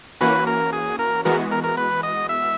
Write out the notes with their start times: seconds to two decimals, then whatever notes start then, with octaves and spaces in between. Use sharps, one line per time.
0.21 E3 A#3 C#4 F#4 B4
0.47 A#4
0.73 G#4
0.99 A#4
1.25 E3 G#3 B3 F#4 A#4
1.52 A#4
1.64 A#4
1.77 B4
2.03 D#5
2.29 E5